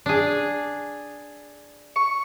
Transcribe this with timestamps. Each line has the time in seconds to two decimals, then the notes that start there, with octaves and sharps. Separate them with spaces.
0.06 D4 G#4
1.96 C#6